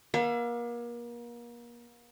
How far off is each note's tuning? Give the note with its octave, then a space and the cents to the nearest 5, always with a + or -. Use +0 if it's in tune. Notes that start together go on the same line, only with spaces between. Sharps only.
A#3 +35 E5 +45